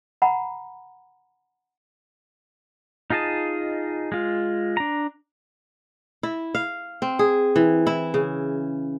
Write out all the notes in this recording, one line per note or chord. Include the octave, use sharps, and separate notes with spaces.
F#5 A#5 B5
D#4 F4 G#4 D#5 A5
G#3 F4
D4 A#5
E4
F5
C4
G#4
E3
E4
C#3